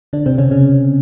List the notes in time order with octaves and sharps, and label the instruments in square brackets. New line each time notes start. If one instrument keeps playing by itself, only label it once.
[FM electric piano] D3 D4
C3 C4
C#3 C#4
C#3 C#4